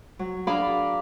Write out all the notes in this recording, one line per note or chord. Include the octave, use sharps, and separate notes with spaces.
F#3
D4 G#4 A#4 D5 F5 B5